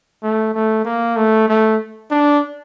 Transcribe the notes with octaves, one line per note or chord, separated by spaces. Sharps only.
A3
A3
A#3
A3
A3
D4